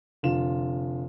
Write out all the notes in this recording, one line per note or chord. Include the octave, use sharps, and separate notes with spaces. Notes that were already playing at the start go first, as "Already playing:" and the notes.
F1 D3 F4 E7